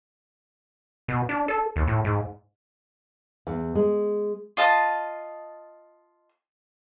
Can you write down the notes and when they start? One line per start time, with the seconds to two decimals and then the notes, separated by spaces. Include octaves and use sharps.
1.08 B2
1.29 D4
1.48 A4
1.76 D#2
1.87 A2
2.05 G#2
3.47 E2
3.75 G#3
4.57 F4 D#5 A5 D#6